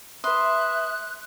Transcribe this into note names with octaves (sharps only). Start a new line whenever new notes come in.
B4 E5 B5 C6 D#6 F#6